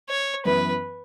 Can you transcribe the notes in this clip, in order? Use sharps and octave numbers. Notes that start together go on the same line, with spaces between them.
C#5
F#2 E3 B3 B4